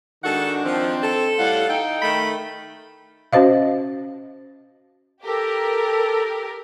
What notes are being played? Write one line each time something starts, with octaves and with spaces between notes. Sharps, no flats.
D#3 G#3 D4 F#4 A4 F#5
F3 C4
A4
A2 G3 F5 F#5
D#4 G5
D#3 A3 B5
C#4 F#4 C5 D#5 F5
G4 A4 A#4